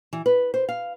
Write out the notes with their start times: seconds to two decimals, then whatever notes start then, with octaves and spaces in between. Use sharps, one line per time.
0.13 E3
0.26 B4
0.54 C5
0.69 F5